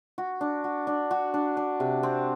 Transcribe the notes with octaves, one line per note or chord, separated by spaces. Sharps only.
F#4
D4
F#4
D4
F#4
D4
D4
C3
C4